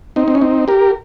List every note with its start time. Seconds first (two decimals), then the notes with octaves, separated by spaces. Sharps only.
0.16 C4 D#4
0.28 C4
0.35 C#4
0.41 C4 D#4
0.68 G4 A#4